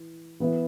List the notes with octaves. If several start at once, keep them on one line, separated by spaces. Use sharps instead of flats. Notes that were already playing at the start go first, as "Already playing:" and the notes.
Already playing: E3
E3 B3 E4